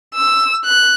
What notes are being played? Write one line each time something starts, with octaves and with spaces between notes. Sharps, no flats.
E6
F#6